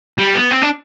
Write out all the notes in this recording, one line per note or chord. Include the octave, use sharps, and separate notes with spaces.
G3
B3
C4
D4